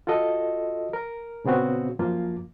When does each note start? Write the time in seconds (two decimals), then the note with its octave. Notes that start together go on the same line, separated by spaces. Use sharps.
0.07 F4 F#4 A4 D#5
0.93 A#4
1.44 A#2 C#3 B3 C4 F#4
1.99 F#2 F3 A#3 F4